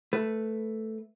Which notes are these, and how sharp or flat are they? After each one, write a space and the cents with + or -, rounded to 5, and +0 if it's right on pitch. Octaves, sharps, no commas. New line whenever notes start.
A3 +0 B4 +0